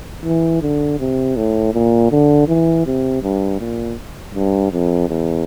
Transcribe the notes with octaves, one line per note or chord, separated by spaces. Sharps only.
E3
D3
C3
A2
A#2
D3
E3
C3
G2
A#2
G2
F2
E2